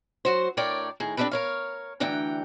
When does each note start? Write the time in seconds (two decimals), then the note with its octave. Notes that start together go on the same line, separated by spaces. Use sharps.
0.25 F#3 F#4 C5
0.57 A2 D4 A#4 C#5 D5 G5
1.00 A2 D#3 G#4 A#5
1.17 C4 D4 F4 G4 A4 B4
1.31 A#4 C#5 F5
2.00 D2 E3 D4 F#5 G5 A#5